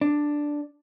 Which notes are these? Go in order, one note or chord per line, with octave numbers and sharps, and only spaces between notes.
D4